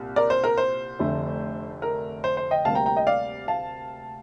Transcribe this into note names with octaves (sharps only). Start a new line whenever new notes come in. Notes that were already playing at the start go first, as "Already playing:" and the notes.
Already playing: C2 A#2
A#4 D5
C5
A#4
C5
F1 F2 D3 A3
A#4
C5
C5
D#5 G5
D2 C3 G3 A#3 F5 A5
G5 A#5
G5 A#5
D#5 G5
D5 F5
F5 A5